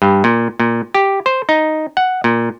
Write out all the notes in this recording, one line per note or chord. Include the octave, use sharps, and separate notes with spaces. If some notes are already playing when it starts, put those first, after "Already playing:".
G2
A#2
A#2
G4
C5
D#4
F#5
A#2